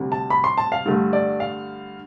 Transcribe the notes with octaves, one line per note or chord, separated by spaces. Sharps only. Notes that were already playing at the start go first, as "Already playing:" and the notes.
Already playing: D2 C3 G3
A5
B5
C6
A5
F5
G2 D3 A3
D5
F5